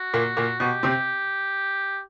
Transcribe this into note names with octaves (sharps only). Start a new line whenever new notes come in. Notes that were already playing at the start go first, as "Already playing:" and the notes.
Already playing: F#4
A#2 A#3
A#2 A#3
B2 B3 G4
C3 C4